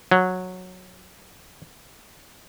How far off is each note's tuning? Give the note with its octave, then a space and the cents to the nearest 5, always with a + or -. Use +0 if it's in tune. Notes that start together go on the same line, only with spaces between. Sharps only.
F#3 -10